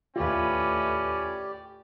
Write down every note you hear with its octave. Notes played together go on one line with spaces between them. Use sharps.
D#2 A2 C#4 F4 G4 B4 D5